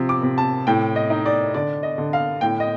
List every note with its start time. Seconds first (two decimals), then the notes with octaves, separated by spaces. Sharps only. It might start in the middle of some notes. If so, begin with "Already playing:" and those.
Already playing: C3 F3
0.09 D6
0.23 C3
0.38 A5
0.67 A2 G5
0.96 D#5
1.10 D#4
1.26 D5
1.54 D3 D5
1.83 D#5
1.98 D3
2.13 F5
2.41 A2 G5
2.60 D#5